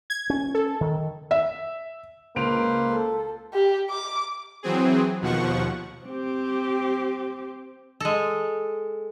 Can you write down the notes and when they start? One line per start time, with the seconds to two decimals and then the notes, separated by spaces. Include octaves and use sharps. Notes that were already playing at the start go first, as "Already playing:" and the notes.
0.10 G#6
0.30 C#4
0.55 A4
0.81 D#3
1.31 E5
2.36 C#2 A#3 B4 C5 D7 F7
2.91 A4
3.53 G4
3.90 D6
4.63 E3 F#3 C4 G#4
5.21 D#2 B2 F3 F#5 C#6
6.05 C4 G4
8.00 G#3 A4